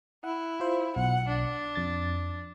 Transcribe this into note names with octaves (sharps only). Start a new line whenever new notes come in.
E4 F#5
F4 C5
B1 F#5
D4
F2 A6